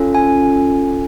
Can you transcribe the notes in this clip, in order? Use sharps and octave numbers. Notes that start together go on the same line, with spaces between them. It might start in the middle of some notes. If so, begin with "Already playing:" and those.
Already playing: C#4 F4 A4
G#5